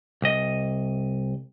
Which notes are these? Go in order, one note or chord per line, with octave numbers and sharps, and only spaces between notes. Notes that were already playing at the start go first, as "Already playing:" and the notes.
C2 D#5